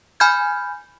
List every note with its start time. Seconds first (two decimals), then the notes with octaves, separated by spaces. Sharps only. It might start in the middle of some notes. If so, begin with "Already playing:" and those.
0.20 G#5 B5 F6 G6 G#6